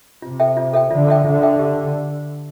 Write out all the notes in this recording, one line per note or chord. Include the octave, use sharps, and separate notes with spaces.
C3 F4
A4 E5 G5
F4
A4 E5 G5
D3 F4
A4 E5 G5
D3 F4
A4 E5 G5
G4